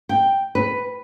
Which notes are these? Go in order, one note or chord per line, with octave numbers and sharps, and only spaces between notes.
G5
B4